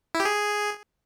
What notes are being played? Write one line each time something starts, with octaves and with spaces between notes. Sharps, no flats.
E4
G4
G#4